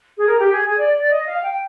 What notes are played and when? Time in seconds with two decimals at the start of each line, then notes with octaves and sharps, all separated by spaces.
0.17 G#4
0.27 A#4
0.39 G4
0.52 G#4
0.65 G#4
0.77 D5
0.94 D5
1.10 D#5
1.27 F5
1.43 G5